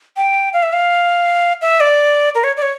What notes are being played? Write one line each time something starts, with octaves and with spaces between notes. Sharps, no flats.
G5
F5
E5
F5
E5
D5
A#4
C#5
D5
C#5